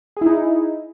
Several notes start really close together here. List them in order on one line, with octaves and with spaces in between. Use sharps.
G#4 E4 D#4